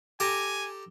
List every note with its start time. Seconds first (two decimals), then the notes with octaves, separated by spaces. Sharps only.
0.20 G4 A4 G#5 A#5